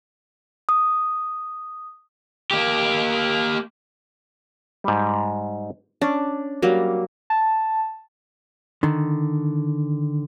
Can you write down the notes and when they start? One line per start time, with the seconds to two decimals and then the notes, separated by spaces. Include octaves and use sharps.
0.69 D#6
2.51 A#3 G4
4.84 G#2 G3
6.01 C#4 D4
6.62 F#3 G3 A#3
7.30 A5
8.83 D3 D#3